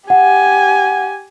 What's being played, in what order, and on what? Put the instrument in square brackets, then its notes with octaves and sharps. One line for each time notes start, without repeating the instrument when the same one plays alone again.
[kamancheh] G4 G#5 [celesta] F#5